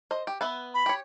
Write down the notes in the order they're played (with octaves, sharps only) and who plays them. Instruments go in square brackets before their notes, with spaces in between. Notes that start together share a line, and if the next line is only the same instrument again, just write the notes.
[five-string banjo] C5 D#5
G4
B3 B4 E5
[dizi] B5
[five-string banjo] G4 C#5